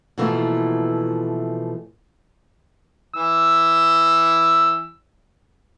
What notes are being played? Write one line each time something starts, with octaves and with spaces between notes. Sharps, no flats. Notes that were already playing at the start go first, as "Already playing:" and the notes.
B2 E3 F3 A3 A#3
E3 E6